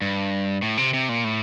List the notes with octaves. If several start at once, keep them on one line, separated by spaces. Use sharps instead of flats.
G2
A2
C3
C3
A#2
A2